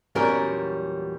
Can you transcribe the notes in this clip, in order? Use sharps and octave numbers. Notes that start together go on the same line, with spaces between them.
E2 A#2 F#3 G3 C#4 A#4